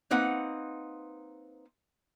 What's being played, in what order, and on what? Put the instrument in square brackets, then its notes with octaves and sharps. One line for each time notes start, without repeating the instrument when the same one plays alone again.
[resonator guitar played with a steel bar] A#3 C4 D#4 B4 F#5